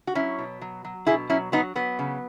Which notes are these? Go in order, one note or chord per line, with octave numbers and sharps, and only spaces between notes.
F#4
F#3 C#4 E4
B2
F#3
F#3
B2 E4 G#4
F#3 C#4 E4
F#3 B3 D#4
F#3 B3
C#3